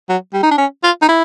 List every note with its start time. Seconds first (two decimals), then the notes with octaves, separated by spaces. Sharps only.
0.09 F#3
0.33 G3
0.43 D#4
0.51 D4
0.58 C#4
0.83 F4
1.02 D#4
1.08 E4